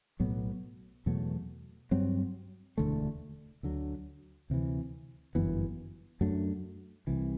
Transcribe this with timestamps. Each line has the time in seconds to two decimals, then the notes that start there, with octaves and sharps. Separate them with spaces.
0.20 B1 A2 F#3 B3
1.06 E2 B2 F#3 A3
1.91 G2 F#3 C4
2.78 E1 D2 D3 A3
3.63 D2 D3 F#3
4.50 D2 C3 E3
5.35 G1 F#2 E3 B3
6.21 F#2 F#3 A3 D4
7.07 C2 C3 E3